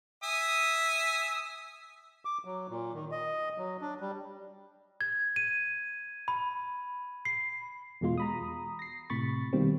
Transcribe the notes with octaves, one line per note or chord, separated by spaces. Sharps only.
E5 G#5 D#6
D6
F#3
A#2
D#3
D#5
F#3
D4
G3
G#6
D#7
B5
C7
E2 B2 G#3 F4 C6
A#5 B5 D#6
A#6 C7
A2 C3 B5 C#6 A6
B2 D#3 G3 A#3 C4